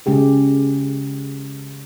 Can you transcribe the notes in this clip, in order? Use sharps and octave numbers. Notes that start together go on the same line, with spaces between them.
C#3 G#3 G4 G#4